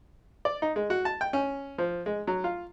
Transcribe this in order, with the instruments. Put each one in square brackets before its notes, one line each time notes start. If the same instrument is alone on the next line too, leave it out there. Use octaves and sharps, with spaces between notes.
[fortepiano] D5
D#4
G#3
F#4
A5
G5
C#4
F3
G#3
F#3
F4